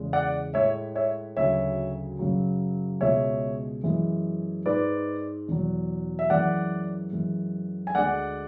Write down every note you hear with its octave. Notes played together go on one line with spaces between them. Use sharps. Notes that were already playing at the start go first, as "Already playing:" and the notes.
Already playing: E2 C#3 G#3
D5 F#5
A2 G#3 C#5 E5
C#5 E5
D2 C#3 F#3 C#5 E5
F#2 C#3 F#3
C#2 B2 G#3 C#5 E5
F#2 E3 G#3
G#2 G#3 B4 D5
E2 B2 F#3
E5
F#2 E3 G#3 D5 F#5
F#2 E3 G#3
G#5
D2 D3 G#3 D5 F#5